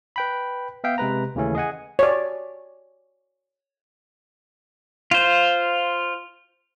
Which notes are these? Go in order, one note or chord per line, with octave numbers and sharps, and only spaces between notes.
B4 G5 B5
B3 E5 F5 G5
C3 G#3 B4 A#5
D#2 C#3 E3 A3 C#4
G#4 D#5 F#5 G#5
C#5 D5
F4 C5